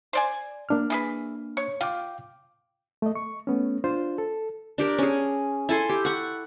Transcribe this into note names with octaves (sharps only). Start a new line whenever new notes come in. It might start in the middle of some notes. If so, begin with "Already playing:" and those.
C5 D5 G#5
A#3 D4 F6
E3 G#4 B4
C#5
F4 F5 G5 D6
A3 D#5
C#6
A3 B3 C#4
D4 F4 C5
A4
D4 G4 A#4
C#4 G#4
E4 A4 G#5 C6
G4
F#5 C#6